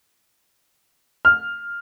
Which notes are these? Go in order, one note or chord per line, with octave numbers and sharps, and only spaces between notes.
F6